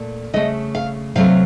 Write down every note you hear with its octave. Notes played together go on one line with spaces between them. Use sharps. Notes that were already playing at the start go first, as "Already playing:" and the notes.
Already playing: A#2 A3
C#3 A3 D#5
F5
C3 F#3 A3 F5